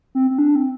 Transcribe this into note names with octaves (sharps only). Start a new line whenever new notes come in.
C4
C4
D4
C4